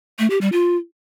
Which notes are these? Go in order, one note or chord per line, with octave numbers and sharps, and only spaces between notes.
A3
G4
G3
F4